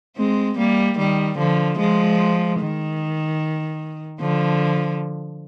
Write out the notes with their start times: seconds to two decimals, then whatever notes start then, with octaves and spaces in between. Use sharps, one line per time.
0.17 G#3 C4
0.58 G3 A#3
0.98 D#3 G3
1.38 D3 F3
1.79 F3 G#3
2.60 D#3
4.20 D3 F3